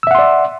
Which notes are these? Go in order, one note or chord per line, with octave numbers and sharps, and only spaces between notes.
D5 E5 F#5 C6 E6